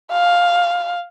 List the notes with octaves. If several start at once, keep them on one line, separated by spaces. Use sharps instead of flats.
F5